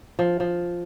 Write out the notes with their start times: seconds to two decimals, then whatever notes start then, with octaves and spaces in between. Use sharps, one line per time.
0.19 F3
0.40 F3